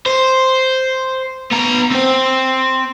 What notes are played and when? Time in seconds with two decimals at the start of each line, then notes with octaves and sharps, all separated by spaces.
0.06 C5
1.51 B3 A#5
1.91 C4 C5